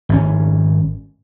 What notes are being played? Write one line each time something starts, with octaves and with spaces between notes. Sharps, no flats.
G#1 C3 C#4